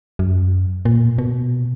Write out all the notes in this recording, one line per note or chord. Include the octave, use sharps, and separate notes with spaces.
F#2
A#2
B2